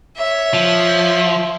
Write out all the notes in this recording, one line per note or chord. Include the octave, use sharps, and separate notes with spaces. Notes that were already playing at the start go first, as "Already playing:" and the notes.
C#5 E5
F3